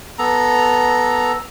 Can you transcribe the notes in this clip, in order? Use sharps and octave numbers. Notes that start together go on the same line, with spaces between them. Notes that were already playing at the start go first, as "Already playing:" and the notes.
B3 A4 A#5